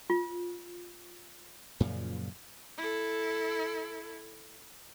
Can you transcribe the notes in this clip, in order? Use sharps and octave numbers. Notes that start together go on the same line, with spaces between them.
F4
F#2 A#2 C#3 F3
E4 A4